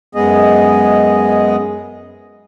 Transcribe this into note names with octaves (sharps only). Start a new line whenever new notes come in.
F#2 G#3 B3 G#4 D#5